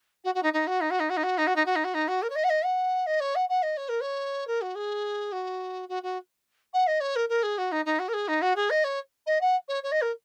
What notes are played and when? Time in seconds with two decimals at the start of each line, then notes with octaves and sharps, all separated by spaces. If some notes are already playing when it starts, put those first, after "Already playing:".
0.24 F#4
0.35 F#4
0.43 D#4
0.53 D#4
0.67 F#4
0.81 D#4
0.90 F#4
1.00 D#4
1.10 F#4
1.17 D#4
1.23 F#4
1.38 D#4
1.47 F#4
1.56 D#4
1.66 F#4
1.76 D#4
1.84 F#4
1.94 D#4
2.08 F#4
2.22 A#4
2.30 C#5
2.35 D#5
2.44 F#5
2.49 D#5
2.64 F#5
3.06 D#5
3.20 C#5
3.35 F#5
3.49 F#5
3.62 D#5
3.77 C#5
3.89 A#4
4.01 C#5
4.47 A#4
4.61 F#4
4.75 G#4
5.32 F#4
5.89 F#4
6.03 F#4
6.73 F#5
6.87 D#5
7.00 C#5
7.16 A#4
7.29 A#4
7.43 G#4
7.58 F#4
7.72 D#4
7.85 D#4
7.99 F#4
8.08 A#4
8.13 G#4
8.28 D#4
8.42 F#4
8.56 G#4
8.70 D#5
8.84 C#5
9.26 D#5
9.41 F#5
9.68 C#5
9.83 C#5
9.92 D#5
10.01 A#4